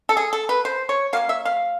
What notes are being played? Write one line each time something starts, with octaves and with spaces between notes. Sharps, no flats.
A4
G#4
A4
B4
C5
C#5
F#3 A#3 C#4 F5
E5
F5